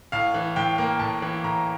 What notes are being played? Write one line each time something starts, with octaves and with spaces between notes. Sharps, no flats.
A2 F5
E3
A2 G5
A#3
A2 A5
E3
A2 A#5